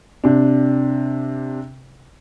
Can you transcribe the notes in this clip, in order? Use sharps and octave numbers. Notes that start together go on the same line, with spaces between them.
C3 D4